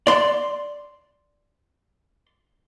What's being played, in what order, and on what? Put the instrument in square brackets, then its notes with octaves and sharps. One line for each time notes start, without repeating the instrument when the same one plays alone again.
[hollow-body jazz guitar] D5 C6